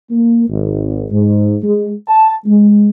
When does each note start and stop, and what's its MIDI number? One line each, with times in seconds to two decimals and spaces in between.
0.11 0.47 58
0.49 1.06 32
1.11 1.56 44
1.63 1.91 56
2.08 2.33 81
2.46 2.89 56